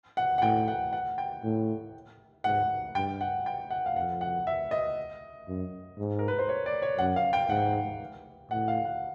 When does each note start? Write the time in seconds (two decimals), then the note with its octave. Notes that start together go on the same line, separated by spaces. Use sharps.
0.17 F#5
0.38 F#5
0.42 A2 G5
0.68 F#5
0.93 F#5
1.18 G5
1.44 A2
2.44 G#2 F#5
2.95 G2 G5
3.21 F#5
3.46 G5
3.71 F#5
3.86 F5
3.96 F2 F#5
4.21 F#5
4.47 E5
4.71 D#5
5.48 F#2
5.98 G#2
6.19 A#4
6.28 B4
6.39 C5
6.49 C#5
6.66 D5
6.82 C#5
6.98 F#2 F#5
7.16 F5
7.33 G5
7.49 G#2 F#5
8.51 A2 F#5
8.68 F5
8.85 F#5